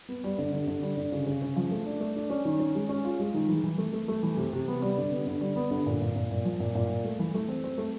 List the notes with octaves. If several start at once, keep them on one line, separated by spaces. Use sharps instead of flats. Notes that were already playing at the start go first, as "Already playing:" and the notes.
B3
G3
D3
D3
D3
G3
D3
C#3
C#3
C#3
F3
A3
D4
A3
D4
C#4
D#3
C#4
G#3
C#4
F4
G#3
D#3
E3
E3
A3
A3
A3
E3
C3
C3
B3
G3
D3
B3
D3
G3
B3
D3
A#2
A#2
A#2
A#2
F3
A#2
A#2
A#2
A3
E3
A3
C4
C4
A3